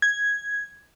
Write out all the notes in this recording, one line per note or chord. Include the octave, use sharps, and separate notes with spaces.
G#6